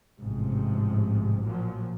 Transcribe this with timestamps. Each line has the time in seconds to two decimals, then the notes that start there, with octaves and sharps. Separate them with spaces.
0.19 A1 G#2 C3 F3
1.42 A#2 F3 F#3